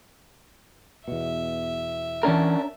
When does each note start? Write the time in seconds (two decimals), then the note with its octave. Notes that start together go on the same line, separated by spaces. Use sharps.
1.08 E2 B2 E5
2.23 E3 C#4 D4 A#4 A5